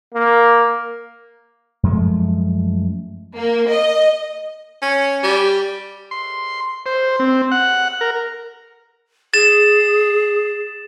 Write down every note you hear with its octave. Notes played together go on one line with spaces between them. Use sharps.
A#3
F#2 F3 G#3 A3
A#3
D#5
C#4
G3
C6
C5
C4
F#5
A#4
G#4 A6 E7